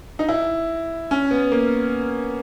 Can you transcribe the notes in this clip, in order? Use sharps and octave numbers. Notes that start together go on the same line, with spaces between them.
D#4
E4
C#4
B3
A#3